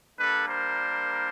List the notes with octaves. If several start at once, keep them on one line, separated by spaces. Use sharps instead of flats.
G3 A#3 D4 A4 B4
A#4 C5